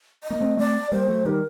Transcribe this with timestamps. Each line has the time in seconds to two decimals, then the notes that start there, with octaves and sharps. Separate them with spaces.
0.24 D#5
0.30 A#3
0.41 A3 C4
0.57 A3 C4 D5
0.91 G3 A#3 C5
1.08 F#3 A3
1.25 D#3 G3 A#4